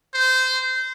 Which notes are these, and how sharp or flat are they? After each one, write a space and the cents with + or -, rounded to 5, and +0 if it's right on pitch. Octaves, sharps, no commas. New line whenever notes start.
C5 -20